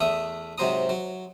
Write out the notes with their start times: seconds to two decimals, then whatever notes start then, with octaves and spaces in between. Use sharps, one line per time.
0.01 E2 A3 E5 D#6
0.58 G#2 C3 F#3 C5 A#5 D#6
0.89 F#3